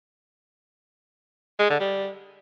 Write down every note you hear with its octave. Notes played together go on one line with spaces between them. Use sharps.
G#3
D3
G3